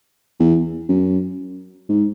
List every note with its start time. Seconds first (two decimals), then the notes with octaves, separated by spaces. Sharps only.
0.40 E2
0.89 F#2
1.89 G#2